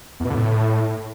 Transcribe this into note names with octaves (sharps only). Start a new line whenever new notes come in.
E2
B2
D3
A2